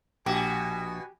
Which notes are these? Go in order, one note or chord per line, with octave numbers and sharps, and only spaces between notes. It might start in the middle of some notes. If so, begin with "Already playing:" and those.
A#1 B2 F#4 G4 G#5